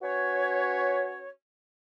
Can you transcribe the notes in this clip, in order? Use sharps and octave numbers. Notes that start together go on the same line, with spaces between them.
C#4 F#4 B4 C#5